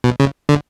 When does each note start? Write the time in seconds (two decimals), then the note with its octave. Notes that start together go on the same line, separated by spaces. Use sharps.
0.04 B2
0.20 C#3
0.49 D3